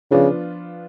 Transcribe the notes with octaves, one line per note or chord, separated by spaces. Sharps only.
C#3 F3 B3 D4 F4